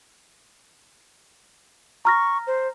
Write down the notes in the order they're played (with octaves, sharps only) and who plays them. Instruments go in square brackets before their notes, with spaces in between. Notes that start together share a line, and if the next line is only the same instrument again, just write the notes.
[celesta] A#5 F6 A#6 [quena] C#6
[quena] C5